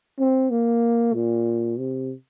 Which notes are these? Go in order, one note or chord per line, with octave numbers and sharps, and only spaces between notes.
C4
A#3
A#2
C3